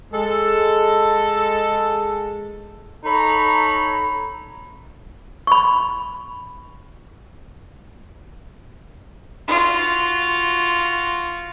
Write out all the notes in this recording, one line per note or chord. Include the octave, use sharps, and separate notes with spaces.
G#3 A4
D#4 A4 C#5 A#5 B5
B5 C#6
F4 F#4